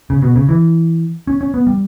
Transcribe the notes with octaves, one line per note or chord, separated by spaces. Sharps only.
C#3
B2
C#3
E3
C#4
C#4
B3
G3